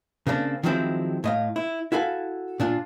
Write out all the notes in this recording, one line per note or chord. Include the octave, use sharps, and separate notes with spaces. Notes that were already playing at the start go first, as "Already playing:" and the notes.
C#3 A#3 C4 D4
D#3 F3 F#3 G#3 C4 E4
A2 D#5 F5
E4
E4 F#4 A4 F5 G#5
A#2 D4 F4